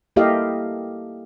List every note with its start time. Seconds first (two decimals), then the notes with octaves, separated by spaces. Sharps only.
0.16 A#3 E4 G4 A4 D#5 F5